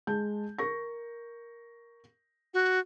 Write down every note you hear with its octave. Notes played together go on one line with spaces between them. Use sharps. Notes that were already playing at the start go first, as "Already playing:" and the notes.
G#3 A5 G6
A#4 C#6 A#6
F#4